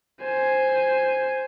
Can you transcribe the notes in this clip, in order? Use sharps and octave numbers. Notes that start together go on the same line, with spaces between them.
C5 G#5